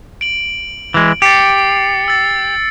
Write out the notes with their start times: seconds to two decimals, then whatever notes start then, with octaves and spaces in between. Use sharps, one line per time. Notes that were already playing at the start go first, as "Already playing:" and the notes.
0.21 D7 F#7
0.94 E3 G#3
1.22 G4 A6 C7 C#7
2.08 E6 A6